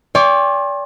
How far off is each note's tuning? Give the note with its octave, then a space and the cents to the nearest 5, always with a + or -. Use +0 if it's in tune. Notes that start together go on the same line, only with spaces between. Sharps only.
D5 -35 G5 +30 C6 +40